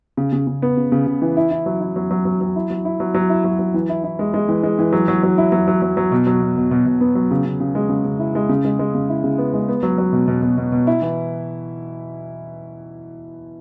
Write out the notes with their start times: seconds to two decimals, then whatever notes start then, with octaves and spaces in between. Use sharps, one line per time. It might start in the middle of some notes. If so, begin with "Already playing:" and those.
0.17 C#3
0.32 C#3
0.47 C#3
0.62 B3
0.77 C#3
0.92 C#3
1.07 C#3
1.22 E3
1.37 E4
1.51 E4
1.66 F#3
1.81 E4
1.96 F#3
2.11 F#3
2.25 F#3
2.41 F#3
2.56 E4
2.70 F#3
2.85 E4
3.00 F#3
3.14 F#3
3.29 E4
3.44 F#3
3.59 F#3
3.74 E3
3.89 E4
4.04 E4
4.19 G#3
4.34 G#3
4.48 E3
4.63 G#3
4.79 E3
4.92 F#3
5.08 F#3
5.23 F#3
5.38 E4
5.52 F#3
5.68 F#3
5.82 F#3
5.97 F#3
6.12 B2
6.27 F#3
6.42 B2
6.57 B2
6.71 B2
6.86 B2
7.01 B3
7.15 F#3
7.31 C#3
7.46 C#3
7.60 C#3
7.75 G#3
7.90 C#3
8.05 C#3
8.19 E4
8.35 G#3
8.49 C#3
8.65 G#3
8.79 G#3
8.95 C#3
9.09 E4
9.24 C#3
9.38 B3
9.54 G#3
9.68 B3
9.83 F#3
9.98 F#3
10.12 B2
10.28 B2
10.42 B2
10.57 B2
10.72 B2
10.87 E4
11.02 E3